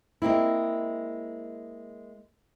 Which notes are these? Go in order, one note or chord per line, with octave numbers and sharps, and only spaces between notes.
G#3 A#3 C4 E4